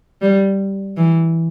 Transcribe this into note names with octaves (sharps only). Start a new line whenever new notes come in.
G3
E3